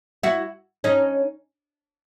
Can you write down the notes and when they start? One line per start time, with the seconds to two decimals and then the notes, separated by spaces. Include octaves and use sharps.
0.23 E4 F#4
0.84 C#4 D#4